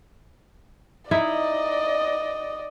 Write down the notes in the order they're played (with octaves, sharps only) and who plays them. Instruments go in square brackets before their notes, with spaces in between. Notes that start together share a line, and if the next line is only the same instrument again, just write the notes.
[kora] D#4 E4 [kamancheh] D5 D#5